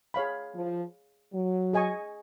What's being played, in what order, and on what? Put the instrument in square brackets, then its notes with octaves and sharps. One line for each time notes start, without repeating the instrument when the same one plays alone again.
[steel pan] G#4 C#5 F5 B5
[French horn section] F3
F#3
[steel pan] G#4 D#5 G#5 C#6